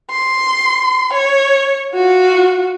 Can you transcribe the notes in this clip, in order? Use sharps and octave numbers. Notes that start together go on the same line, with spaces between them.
C6
C#5
F4 F#4